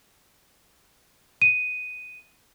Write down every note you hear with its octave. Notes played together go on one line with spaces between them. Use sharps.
D#7